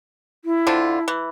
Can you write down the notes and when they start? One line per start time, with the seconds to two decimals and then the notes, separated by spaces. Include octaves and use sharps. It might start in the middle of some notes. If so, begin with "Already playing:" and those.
0.45 E4
0.67 D3 C4 F4
1.08 E3